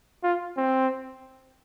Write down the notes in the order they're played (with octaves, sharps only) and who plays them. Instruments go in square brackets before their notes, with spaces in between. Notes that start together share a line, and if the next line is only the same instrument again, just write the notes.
[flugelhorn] F4
C4